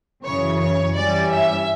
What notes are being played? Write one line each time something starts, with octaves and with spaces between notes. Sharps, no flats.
F#2 C#3 E3 C#5
C#5
G2 E3 G3 C#4 D5
E5